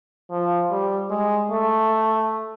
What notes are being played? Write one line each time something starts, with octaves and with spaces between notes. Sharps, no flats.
F3
G3
G#3
A3